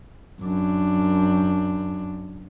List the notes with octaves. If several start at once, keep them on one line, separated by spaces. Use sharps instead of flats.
F#2 D4